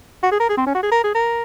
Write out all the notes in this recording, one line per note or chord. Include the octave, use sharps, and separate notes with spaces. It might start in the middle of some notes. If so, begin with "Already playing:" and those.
F#4
G#4
A#4
G#4
C4
C#4
F#4
G#4
A#4
G#4
A#4